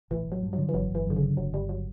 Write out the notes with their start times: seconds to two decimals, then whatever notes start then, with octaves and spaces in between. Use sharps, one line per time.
0.10 A1 E3
0.27 A1 F#3
0.42 G2
0.53 F#3
0.58 D3
0.69 E3
0.74 G1 F#3
0.90 G1 E3
1.06 F#2 D3
1.16 C#3
1.21 D3
1.37 G1 F#3
1.53 G1 G3
1.69 F#3